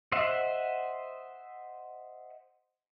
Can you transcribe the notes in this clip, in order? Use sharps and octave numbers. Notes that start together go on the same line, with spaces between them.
C5 D#5 E5 F#5